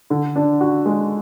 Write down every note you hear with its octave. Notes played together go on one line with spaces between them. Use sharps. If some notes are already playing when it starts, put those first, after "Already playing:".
D3
D4
F#4
G#3